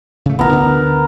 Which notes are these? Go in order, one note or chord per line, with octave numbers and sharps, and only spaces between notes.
C#3 A3
A1 B3 A#4
D2 D3